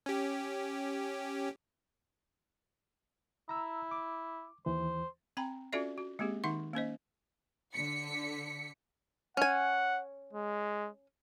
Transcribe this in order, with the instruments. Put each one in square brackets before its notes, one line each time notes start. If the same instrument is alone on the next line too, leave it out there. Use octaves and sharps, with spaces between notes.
[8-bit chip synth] C#4 G4
[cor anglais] E4 [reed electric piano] A#5 E6
[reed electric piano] D6
[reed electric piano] D#2 E3 [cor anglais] C5
[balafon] C4 G5 A#5 B5
C#4 F4 F#4 A4 D5 E5
F#4
G#3 A#3 C4 G4 G#4
D#3 D#4 E5 F#5 C6 C#6
A#3 C#4 C5 D#5
[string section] D3 B6 C#7
[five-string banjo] C#4 G#5 [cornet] F#5
[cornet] G#3